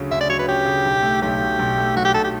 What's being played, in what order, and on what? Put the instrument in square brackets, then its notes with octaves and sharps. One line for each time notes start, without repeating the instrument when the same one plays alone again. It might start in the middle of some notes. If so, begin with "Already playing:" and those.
Already playing: [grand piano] D2 C#3 F#3 C#4
[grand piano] D2 [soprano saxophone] E5
[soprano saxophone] D5
[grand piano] F#3 [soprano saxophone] C#5
[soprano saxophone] B4
[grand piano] C#4 [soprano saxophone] G4
[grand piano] C#3
B1
A3
[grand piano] B1 [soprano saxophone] G4
[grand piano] B2
B1
A3
[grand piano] B1 [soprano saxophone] F#4
[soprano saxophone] G4
[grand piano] B2 [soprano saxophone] A4
[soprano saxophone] G4